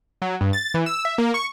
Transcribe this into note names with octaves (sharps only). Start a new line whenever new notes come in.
F#3
G2
A6
E3
E6
E5
A#3
C#6